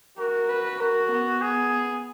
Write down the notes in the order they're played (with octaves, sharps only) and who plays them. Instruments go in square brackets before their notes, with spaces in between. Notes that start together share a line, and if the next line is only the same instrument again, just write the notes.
[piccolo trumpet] F#4 [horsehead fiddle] A#4
[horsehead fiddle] B4
[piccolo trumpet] F#4 [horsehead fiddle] A#4
[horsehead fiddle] B3
[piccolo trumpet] G#4